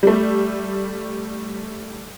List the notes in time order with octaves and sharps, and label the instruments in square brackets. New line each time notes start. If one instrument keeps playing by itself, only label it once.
[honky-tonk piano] G3 A3